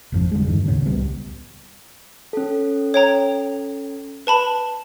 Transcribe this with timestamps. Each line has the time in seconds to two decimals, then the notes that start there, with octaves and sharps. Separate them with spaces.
0.12 G#1 F2 F3
0.31 D3 G3 G#3
0.47 E2 G2 D#3
0.68 D#2 A2 C#3 C#4
0.86 C2 G3 B3
2.33 C#4 A4
2.94 C#5 G5 A#5
4.27 B4 A5 B5